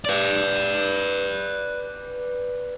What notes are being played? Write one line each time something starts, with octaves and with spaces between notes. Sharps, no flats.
B4 D5